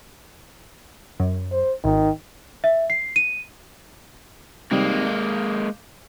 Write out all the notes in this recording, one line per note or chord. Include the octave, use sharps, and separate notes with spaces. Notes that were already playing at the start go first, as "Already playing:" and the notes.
F#2
C5
G#1 D#3
E5
C7
D#7
C3 D#3 G3 G#3 A#3
F5 D6 G6